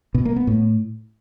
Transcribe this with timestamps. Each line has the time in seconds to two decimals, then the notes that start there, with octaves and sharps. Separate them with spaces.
0.14 B2
0.25 A#3
0.36 B3
0.47 A2